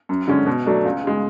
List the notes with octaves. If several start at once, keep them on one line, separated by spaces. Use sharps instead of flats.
F#2
D3 G#3 C#4
B2
F#3 A3 D4
C#2
C#3 G#3